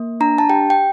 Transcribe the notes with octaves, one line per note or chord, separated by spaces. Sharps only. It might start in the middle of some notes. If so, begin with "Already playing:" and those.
Already playing: A#3
D4 A#5
A5
G4 G5
G5